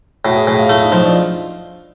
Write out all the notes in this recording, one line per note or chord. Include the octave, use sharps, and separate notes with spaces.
A2 F#4
G#4
A2 G#4
F4
A3 E4
D#4
F3 D#4
D4